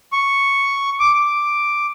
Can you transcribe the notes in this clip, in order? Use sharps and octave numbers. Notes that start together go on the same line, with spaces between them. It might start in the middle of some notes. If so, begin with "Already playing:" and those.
C#6
D6
D6